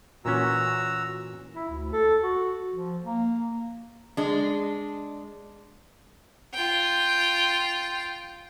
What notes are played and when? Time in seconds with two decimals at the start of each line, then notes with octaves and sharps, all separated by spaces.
0.25 A#2 E3 C#4 F#4 A#5 E6
1.56 E4
1.70 D2
1.93 A4
2.23 F#4
2.72 F3
3.02 A#3
4.17 G#3 D4
6.54 F4 G5